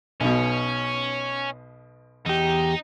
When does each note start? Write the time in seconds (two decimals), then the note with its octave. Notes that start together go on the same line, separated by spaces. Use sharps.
0.21 B1 B2 C#4
2.26 E2 D#4 G4